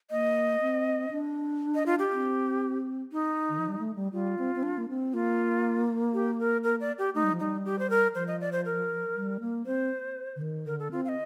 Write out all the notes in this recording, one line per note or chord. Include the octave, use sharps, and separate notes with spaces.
A#3 D#5
C4
D4
D#5
F4
G4
C4
D#4
D#3
F3
G3
A3
G3
G3 F4
C4
C4
D4
A#3
C4
A#3 F4
G4
A#4
A#4
D5
G4
A3 D#4
G3
F3
G3 D#4
G4
C5
A#4
F3 C5
D#5
D5
C5
A#4
G3
A#3
C4 C5
D3
D#3
D3 A#4
A4
C4 F4
F5
D#5